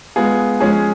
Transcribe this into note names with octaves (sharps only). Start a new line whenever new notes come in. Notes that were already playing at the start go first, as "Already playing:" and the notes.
G#3 B3 F4 G#4
F3 G#3 C#4 G#4